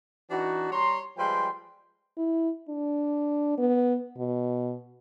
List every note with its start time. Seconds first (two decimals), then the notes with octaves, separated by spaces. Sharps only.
0.30 E3 D4 D#4 F#4
0.71 G3 C#5 A#5 C6
1.17 F3 G3 G#3 B4 G5 C6
2.17 E4
2.69 D4
3.58 B3
4.17 B2